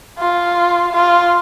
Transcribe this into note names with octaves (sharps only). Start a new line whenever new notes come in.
F4
F4